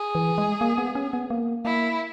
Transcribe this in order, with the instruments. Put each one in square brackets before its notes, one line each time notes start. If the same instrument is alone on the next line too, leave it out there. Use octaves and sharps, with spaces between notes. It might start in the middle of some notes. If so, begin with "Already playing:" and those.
Already playing: [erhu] G#4
[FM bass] E3
G#3
A#3
B3
C#4
B3
A#3
[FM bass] A#3 [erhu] E4